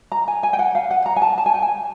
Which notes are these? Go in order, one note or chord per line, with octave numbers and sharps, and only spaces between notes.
A#5
G#5
G#5
G5
F#5
F5
F#5
A#5
G#5
A5
A5
G#5
G5
G#5